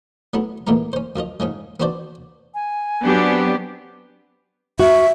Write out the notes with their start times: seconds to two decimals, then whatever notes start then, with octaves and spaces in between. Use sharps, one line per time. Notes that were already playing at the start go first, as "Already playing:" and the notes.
0.34 F#3 A3 B3 E4
0.67 D#2 A#2 E3 A3 B3 A#5
0.93 C#4 C5
1.16 F#2 F3 F4 D#5
1.40 G#2 C#3 F3 G#3
1.80 B3 C4 D4 F#4 C5 D5
2.54 G#5
3.04 F#3 B3 C4 D4 G4
4.80 F#4 E5